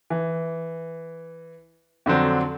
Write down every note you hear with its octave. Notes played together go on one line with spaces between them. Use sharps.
E3
F2 D3 F#3 C4 D4